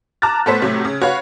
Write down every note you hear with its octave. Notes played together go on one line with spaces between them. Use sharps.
A5 A#5 D6 F6 F#6 A6
A2 B3 A4 B4 C5 B6
A2 C3 F#3 A3
C#3
F#4 B4 C#5 F5